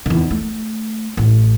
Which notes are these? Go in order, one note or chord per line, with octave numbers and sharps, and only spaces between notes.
E2 D#3
A3
A1 A2